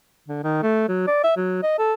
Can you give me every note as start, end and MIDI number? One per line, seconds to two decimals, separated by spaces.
0.28 0.40 50
0.44 0.60 51
0.63 0.84 57
0.88 1.04 54
1.07 1.20 74
1.23 1.32 76
1.37 1.62 54
1.63 1.77 75
1.79 1.94 69